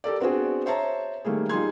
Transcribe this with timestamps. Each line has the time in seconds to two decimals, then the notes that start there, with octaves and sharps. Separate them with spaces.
0.04 G4 A4 A#4 D5
0.20 B3 C4 D4 F#4 G#4
0.66 C5 C#5 E5 A5 A#5
1.25 D#3 G3 A3 A#3 G#4
1.49 G3 D#4 F4 G#4 C6 G#6